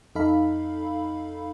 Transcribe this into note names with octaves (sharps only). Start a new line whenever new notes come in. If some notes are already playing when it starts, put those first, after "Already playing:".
F2 D#4 A4 F5 B5